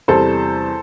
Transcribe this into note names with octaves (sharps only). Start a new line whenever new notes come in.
E2 C3 G3 A4 C5